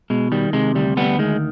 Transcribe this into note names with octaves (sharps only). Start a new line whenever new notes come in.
B2 G#3
D#3 G3
C3 G#3
D2 G3
D2 G3 B3
D#3 G#3